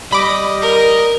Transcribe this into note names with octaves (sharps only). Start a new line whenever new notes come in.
G3 D#5 B5 D6
A#4